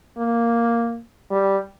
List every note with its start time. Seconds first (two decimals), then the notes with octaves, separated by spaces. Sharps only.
0.18 A#3
1.31 G3